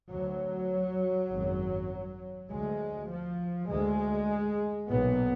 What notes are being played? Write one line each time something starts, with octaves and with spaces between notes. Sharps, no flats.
D2 F#3
G#1 F#2
D2 G#3
F3
D2 G#3
B1 A#2 B3